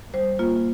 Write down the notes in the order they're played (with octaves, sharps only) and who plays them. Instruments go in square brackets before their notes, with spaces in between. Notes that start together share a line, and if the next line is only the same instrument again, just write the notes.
[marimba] G3 C5
A#3 F4